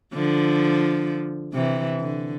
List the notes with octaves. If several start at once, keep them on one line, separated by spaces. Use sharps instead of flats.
D3 F3
C3 E3
D3